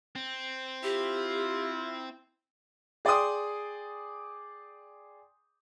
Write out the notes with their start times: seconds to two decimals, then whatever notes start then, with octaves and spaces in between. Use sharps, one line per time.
0.15 C4
0.83 E4 F4 G4
3.05 G#4 D5 G5 C6 D#6